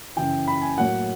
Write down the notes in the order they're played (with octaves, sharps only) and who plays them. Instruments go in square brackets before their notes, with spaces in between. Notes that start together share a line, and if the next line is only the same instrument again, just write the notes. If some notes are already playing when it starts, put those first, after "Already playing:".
[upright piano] F#2 C#3 E3 G5
B5
G#5
A2 F#3 A#3 F#5